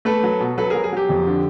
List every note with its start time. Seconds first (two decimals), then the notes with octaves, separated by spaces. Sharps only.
0.05 A3 A4 B4
0.23 F#3
0.40 B2
0.58 F#3 A4 B4
0.70 F#3 G#4 A#4
0.84 G#4
0.93 F#3 G4
1.09 F2
1.27 D3